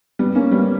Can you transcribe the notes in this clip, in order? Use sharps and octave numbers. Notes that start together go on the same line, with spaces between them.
G3 B3
A#3 C#4
G3 B3